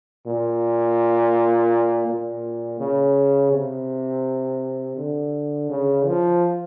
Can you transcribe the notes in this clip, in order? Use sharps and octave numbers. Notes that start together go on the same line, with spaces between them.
A#2
A#2
C#3
C3
D3
C#3
F3